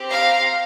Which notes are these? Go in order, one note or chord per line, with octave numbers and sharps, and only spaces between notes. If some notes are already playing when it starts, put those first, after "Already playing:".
Already playing: C4 G4
F5 A#5